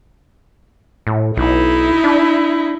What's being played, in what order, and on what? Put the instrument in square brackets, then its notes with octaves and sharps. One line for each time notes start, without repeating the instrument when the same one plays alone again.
[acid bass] A2
[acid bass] B1 [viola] D#4 E4
[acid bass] D4